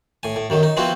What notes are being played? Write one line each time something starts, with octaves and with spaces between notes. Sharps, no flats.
A2 G#5
A2
F#2 D#3 F#3
D#4
F3 B3 C4 E4 F#4